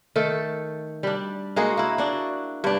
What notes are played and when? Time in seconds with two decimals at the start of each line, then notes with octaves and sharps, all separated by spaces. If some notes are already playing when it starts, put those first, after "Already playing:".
0.16 D#3 A3 A4
1.03 G3 D4
1.56 G#3 A#3 F#4 G#4
1.77 A#3 E4
1.98 D4 F#4
2.64 G2 D4